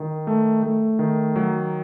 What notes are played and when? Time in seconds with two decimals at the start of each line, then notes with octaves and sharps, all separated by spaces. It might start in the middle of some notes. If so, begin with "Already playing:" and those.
Already playing: D#3
0.27 A3
0.63 A3
0.99 D#3
1.36 F#3